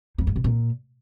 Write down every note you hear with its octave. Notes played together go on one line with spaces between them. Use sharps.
F2
G2
B2
A#2